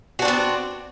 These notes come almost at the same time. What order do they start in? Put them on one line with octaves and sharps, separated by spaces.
F#4 D4 C4 B3